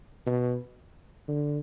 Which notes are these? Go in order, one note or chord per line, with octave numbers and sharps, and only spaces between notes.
B2
D3